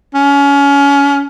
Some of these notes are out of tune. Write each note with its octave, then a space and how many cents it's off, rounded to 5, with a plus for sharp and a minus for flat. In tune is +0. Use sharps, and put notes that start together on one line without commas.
C#4 +25